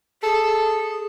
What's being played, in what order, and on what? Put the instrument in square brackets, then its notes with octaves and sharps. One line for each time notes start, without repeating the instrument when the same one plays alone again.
[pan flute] G#4 [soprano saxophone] A4